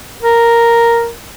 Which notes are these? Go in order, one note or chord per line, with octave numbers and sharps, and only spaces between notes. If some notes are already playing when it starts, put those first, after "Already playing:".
A#4